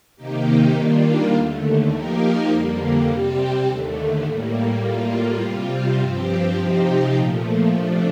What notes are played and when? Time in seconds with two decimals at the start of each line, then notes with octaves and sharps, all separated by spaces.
0.16 C3 D#3 A#3 D#4 G4
0.74 D#3 G3 A#3 D4 F4
1.33 D#2 D3 A3
1.90 F3 A#3 D#4 G4 A#4
2.49 F2 D3 G3 A#3
3.08 C3 G3 C4 G4
3.65 D#2 D3 A3
4.24 A2 G3 A#3
4.82 A2 G3 A#3 F4
5.41 C3 G3 C4 F4
5.98 G2 F3 C4 G4
6.57 C3 F3 C4 D#4 G4
7.15 A#2 F3 A3
7.73 C3 F3 A3 D4